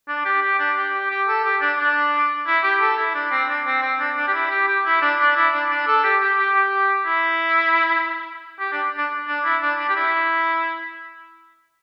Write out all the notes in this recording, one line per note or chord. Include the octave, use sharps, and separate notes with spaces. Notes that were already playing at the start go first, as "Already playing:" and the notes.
D4
G4
G4
D4
G4
G4
G4
A4
G4
D4
D4
E4
G4
A4
E4
D4
C4
D4
C4
C4
D4
D4
G4
E4
G4
G4
E4
D4
D4
E4
D4
D4
A4
G4
G4
G4
G4
E4
G4
D4
D4
D4
E4
D4
D4
G4
E4